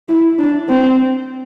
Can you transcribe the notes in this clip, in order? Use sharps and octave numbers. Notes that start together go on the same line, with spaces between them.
E4
D4
C4